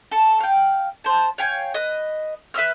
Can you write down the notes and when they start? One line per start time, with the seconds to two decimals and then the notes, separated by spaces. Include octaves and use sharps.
0.11 A4 C#6
0.40 F5 G5
1.04 C5 A5
1.38 C#5 F5 G5 G#5
1.74 B4 D#5
2.54 B4 E5 E6 F6